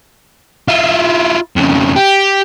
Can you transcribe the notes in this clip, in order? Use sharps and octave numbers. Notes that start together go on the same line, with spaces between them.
E4 F4
F2 C#3
G4